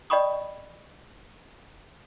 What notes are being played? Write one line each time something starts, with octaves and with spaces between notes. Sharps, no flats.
D5 D#5 G5 B5 C#6 D#6